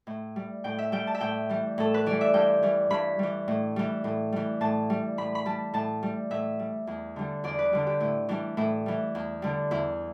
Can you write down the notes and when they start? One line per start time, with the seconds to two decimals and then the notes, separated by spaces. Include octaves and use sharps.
0.07 A2
0.36 G3
0.64 A2 G5
0.78 E5
0.92 G3 G5
1.07 A5
1.14 E5
1.21 A2 G5
1.49 E3 G3
1.78 A2 A4
1.94 B4
2.06 E3 G3 D5
2.21 E5
2.34 G2 G5
2.63 E3 G3
2.90 G2 B5
3.19 E3 G3
3.48 A2
3.76 E3 G3
4.04 A2
4.32 E3 G3
4.61 A2 A5
4.90 G3
5.18 A2 B5
5.35 B5
5.46 G3 A5
5.74 A2 A5
6.03 G3
6.31 A2 E5
6.59 G3
6.87 E2
7.16 D3 G3
7.44 E2 D5
7.59 B4
7.73 D3 G3
7.87 G4
8.00 A2 E4
8.29 E3 G3 D4
8.57 A2 E4
8.86 E3 G3
9.15 E2
9.42 D3 G3
9.71 E2 E4